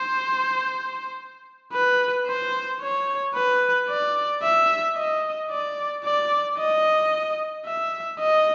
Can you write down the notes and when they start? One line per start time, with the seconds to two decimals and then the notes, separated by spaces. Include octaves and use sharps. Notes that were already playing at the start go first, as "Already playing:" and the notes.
Already playing: C5
1.73 B4
2.27 C5
2.81 C#5
3.35 B4
3.89 D5
4.43 E5
4.96 D#5
5.50 D5
6.04 D5
6.58 D#5
7.66 E5
8.19 D#5